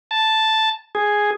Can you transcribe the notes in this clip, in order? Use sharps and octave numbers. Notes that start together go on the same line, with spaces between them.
A5
G#4